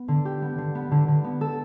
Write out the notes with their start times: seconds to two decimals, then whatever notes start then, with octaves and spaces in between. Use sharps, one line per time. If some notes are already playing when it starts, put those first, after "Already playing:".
Already playing: B3
0.08 D3
0.25 G4
0.42 B3
0.58 D3
0.75 B3
0.91 D3
1.08 D3
1.24 B3
1.41 A4